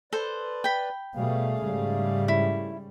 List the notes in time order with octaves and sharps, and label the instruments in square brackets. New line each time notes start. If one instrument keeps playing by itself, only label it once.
[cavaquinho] A4 C5 [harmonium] B4 D5
[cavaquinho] G5 B5
[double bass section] B2 G3 [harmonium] A3 G#4 F5
[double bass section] G#2 C#3 G3
[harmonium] A3 [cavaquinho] E4